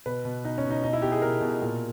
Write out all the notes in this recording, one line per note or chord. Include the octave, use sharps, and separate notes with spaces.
B2 B4
B2
B2 D#4
C#4
B2
D#4
B2 D#4
E4
B2 G4
G#4
B2 A#4
B2
A#2